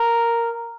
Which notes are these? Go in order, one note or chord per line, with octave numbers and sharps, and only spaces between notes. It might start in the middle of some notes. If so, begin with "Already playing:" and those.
Already playing: A#4